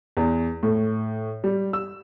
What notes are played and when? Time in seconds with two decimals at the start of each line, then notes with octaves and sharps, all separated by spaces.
0.17 E2
0.63 A2
1.44 G3
1.73 E6